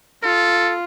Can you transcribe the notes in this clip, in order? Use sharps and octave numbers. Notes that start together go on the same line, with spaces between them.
F4 A4